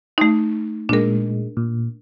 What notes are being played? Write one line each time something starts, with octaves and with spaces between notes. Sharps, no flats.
A3 D#4
A#2 G#3 D4 A#4
A#2